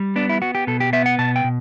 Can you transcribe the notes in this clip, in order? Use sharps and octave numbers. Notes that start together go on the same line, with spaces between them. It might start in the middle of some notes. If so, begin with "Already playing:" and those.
Already playing: G3
B3 D4
E4
B3 F#4
G4
B2 A4
G4
B3 E5
F#5
B2 A5
G5
B2